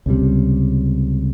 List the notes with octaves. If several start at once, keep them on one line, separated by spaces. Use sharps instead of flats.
C#2 C3 G3